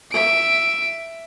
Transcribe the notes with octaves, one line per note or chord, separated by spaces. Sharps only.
E5 D7